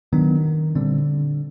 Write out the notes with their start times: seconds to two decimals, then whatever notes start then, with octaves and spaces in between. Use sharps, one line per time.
0.13 D#3 F#3 B3 D4
0.75 A#2 D3 G3 C4